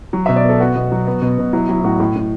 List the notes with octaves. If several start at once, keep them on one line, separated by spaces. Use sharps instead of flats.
F#3
B2 E5
D5
B3 A4
B3 F#4
B2
F#3
B3
B2
B2
F#3 E4
F#3 E4
E4
A2 F#4
A2
A2